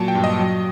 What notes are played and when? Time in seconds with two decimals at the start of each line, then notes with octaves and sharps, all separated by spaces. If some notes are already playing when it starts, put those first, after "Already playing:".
Already playing: A#2 F#3 A5
0.08 G5
0.15 G2
0.24 D#5
0.39 F#3